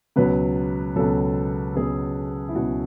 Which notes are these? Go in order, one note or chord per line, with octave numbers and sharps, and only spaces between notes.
C#2 B2 F#3 B4
C#2 B2 F#3 A4
C#2 B2 F#3 G#4
E4
C#2 B2 F#3 F#4